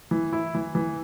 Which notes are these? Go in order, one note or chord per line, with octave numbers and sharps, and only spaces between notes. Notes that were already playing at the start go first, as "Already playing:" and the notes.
E3
E4
E3
E3